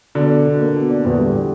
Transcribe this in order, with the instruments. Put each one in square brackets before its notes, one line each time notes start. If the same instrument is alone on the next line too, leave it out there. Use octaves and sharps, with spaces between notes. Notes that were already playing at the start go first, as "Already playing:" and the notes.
[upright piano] B2 [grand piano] D3
[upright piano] D4
B2
A#3
B2
D4
[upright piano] E2 [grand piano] D3
[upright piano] G3